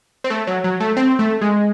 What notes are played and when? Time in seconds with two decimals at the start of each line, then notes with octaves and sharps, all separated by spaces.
0.24 C4
0.30 A3
0.47 F#3
0.64 F#3
0.80 A3
0.97 C4
1.19 A3
1.41 G#3